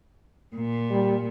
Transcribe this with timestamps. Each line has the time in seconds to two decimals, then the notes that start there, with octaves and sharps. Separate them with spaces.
0.56 A#2
0.91 G3